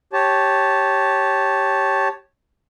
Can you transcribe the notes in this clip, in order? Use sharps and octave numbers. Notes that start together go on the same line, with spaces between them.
G4 C#5 A5